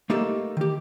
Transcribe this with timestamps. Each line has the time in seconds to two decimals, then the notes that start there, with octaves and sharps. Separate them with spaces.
0.10 A3 A#3 D#4 G4 A4
0.57 D#3 G4